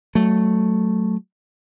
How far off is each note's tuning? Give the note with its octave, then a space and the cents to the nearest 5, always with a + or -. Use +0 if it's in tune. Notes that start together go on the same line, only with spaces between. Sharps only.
F#3 +15 A3 +0